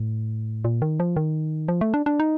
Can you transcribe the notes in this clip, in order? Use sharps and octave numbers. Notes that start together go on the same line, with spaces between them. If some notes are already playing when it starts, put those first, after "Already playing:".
Already playing: A2
A#2
D#3
F3
D#3
F3
A3
D4
D4
D#4